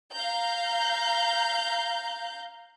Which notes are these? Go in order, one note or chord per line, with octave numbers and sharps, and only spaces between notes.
F5 A#5 G6